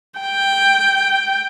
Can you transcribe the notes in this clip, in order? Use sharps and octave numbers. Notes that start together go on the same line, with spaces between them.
G5